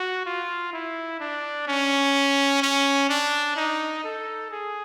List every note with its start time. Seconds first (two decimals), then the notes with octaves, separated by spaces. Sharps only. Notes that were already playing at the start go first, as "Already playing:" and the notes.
Already playing: F#4
0.26 F4
0.73 E4
1.21 D4
1.68 C#4
2.62 C#4
3.09 D4
3.56 D#4
4.04 A4
4.51 G#4